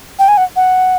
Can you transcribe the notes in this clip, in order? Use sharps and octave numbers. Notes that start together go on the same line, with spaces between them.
G5
G#5
F#5
F#5